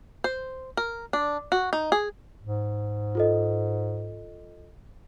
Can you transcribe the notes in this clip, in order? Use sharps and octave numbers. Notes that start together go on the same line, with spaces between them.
C5
A#4
D4
F#4
D#4
G#4
G#2
F4 A4 D#5